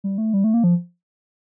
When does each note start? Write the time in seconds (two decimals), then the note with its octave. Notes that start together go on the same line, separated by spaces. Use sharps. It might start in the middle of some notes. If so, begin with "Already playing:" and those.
0.04 G3
0.18 A3
0.34 G3
0.44 A3
0.54 A#3
0.64 F3